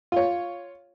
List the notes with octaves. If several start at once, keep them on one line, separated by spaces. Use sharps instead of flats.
F4 C#5